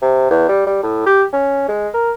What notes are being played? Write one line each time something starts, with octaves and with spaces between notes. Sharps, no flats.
C3
E2
G3
G3
A2
G4
C#4
G#3
A#4